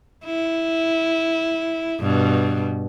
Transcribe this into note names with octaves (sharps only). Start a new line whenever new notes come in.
E4
G2 B2